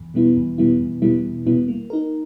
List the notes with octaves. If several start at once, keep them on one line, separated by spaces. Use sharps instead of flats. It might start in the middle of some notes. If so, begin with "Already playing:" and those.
Already playing: E2
B2 G3 B3 E4
E2
B2 G3 B3 E4
E2
B2 G3 B3 E4
E2
B2 G3 B3 E4
A#3
D#4 A#4